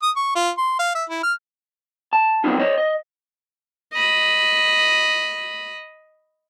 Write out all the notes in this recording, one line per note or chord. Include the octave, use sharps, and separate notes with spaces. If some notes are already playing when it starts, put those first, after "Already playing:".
D#6
C#6
F4
C6
F5
E5
E4
F6
A5
F#3 B3 C4 D#4 F4
C5 C#5 D#5
D#5
D#5 B5